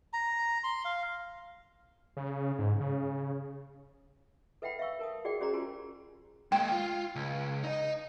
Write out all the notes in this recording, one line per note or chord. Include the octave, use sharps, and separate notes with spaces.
A#5
C6
F5
C#3
G#2
C#3
A4 B4 E5 F#5 G5 B5
E5 F5 C#6 E6
A#4 A5 D#6
F#4 G#4 D5 F#5 G5
C#4 F#4 G#4 C5 D5 A#5
C#4 F4 G4 A#4 G#5 C6
G#3 A#3 G5
F4
C#2
D#4 D#5